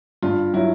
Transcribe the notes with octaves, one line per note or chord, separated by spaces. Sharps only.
G2 F4
F#3 E4